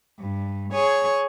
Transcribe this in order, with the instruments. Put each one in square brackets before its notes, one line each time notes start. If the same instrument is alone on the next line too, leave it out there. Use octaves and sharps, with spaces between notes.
[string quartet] G2
G#4 C#5 C#6